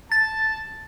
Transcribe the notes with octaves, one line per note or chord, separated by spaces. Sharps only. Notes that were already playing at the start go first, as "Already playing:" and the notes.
A5 A6